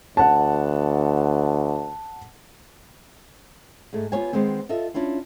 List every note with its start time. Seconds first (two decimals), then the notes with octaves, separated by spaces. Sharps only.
0.17 D2 F#5 A5
3.93 G#2 G#3 A3
4.12 B3 F4 G4 C#5 F5 G#5
4.33 D#3 G#3 B3 C4
4.69 F4 A4 D#5 E5
4.94 C#4 D4 E4 F4